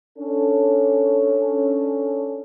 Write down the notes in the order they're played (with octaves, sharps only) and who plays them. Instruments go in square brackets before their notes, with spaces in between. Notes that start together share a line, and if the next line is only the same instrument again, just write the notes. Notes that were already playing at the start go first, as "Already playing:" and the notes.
[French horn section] C#4 D4 A4